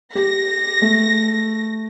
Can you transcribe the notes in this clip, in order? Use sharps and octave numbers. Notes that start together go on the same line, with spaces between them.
G4 A#6
A3